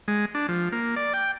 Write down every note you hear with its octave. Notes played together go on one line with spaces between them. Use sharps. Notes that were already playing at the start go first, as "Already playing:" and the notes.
G#3
D4
F3
A#3
D5
G5